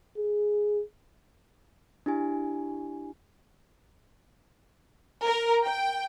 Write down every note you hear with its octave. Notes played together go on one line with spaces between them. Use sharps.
G#4
D4 E4 G4 G#5
A#4
G5